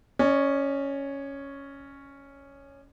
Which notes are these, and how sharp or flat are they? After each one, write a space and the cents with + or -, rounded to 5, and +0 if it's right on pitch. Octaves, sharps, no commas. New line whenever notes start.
C#4 +0 D5 +40